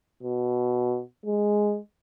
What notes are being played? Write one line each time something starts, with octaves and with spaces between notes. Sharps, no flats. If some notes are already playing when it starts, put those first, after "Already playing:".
B2
G#3